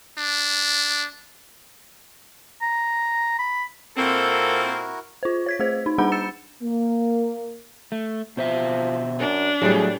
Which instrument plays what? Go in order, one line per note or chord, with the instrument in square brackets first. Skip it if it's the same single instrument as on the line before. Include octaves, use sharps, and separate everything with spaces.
[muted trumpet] D4
[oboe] A#5
B5
[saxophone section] A#2 A#3 C4 [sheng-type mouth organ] E4 F#4 A#4 [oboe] A4
[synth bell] F4 C5
C#5 G#6 B6
A3 G#4 C5
D#4
G3 D4 G#4 F#5 B5 G6
E6 A6 C#7 E7
[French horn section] A#3
[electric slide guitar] A3
[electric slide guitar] B2 C5 E5 [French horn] F3
[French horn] F#2 [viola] D4
[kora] A2 G3 [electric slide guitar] F#3 A3 [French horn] G#4